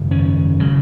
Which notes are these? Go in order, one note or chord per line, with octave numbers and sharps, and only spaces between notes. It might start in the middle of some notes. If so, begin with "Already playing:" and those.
Already playing: G#1 F#2 C#3
C#4
C#3 F#3